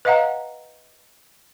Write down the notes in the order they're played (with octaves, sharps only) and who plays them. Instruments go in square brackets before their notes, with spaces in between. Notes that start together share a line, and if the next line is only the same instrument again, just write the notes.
[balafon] B4 D#5 F5 F#5 A#5